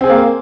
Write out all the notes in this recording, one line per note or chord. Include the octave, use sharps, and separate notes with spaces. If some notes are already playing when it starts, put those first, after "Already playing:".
A#3 C4 G#4 C5